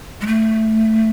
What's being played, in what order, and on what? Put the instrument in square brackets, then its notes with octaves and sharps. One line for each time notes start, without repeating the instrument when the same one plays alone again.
[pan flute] G#3
A3